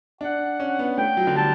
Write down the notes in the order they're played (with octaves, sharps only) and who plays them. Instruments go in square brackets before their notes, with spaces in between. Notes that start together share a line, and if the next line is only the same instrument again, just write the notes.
[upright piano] D4 [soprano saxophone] F#5
[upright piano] C#4
B3
[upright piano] A3 [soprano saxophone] G5
[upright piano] F#3
D3
[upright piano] G3 [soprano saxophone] A5